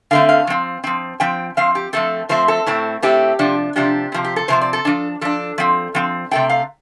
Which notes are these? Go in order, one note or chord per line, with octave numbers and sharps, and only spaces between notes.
D3 A3 C4 F5
F5
F3 C4
F3 C4
F3 C4 G5
F3 C4 F5
G4
F3 A3 C4 A4
F3 A3 C4 C5
A4
A2 A3 C4
A2 A3 C4 G4
C3 F3 D4
C3 F3 D4 G4
C3 F3 C4
G4
A4
C3 F3 C4 C5
D5
A4
F3 D4
F3 D4 A4
F3 C4
F3 C4
C3 A3 C4 G5
F5